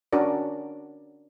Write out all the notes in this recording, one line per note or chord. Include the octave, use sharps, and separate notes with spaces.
C#4 D4 F#4 A#4 D5